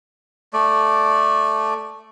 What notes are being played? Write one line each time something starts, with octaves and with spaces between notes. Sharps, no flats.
A3 D5